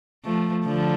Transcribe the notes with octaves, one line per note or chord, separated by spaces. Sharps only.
F3 A3
D3 F3